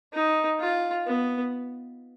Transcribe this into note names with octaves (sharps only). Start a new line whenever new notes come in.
D#4
F4
B3